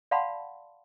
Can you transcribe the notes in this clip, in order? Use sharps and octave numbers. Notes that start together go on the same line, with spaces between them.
D5 F5 F#5 A5 B5 C6